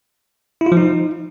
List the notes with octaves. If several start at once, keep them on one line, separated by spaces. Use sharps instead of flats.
E4
F4
F3
D#4